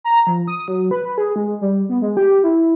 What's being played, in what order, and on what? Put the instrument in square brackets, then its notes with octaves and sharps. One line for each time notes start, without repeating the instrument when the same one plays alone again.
[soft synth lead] A#5
F3
D#6
F#3
B4
G#4
G#3
G3
B3
G#3
G4
E4